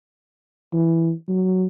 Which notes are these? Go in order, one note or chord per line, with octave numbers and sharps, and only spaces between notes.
E3
F#3